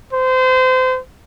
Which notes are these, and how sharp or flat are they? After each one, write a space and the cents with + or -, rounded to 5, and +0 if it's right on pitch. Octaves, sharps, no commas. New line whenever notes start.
C5 -30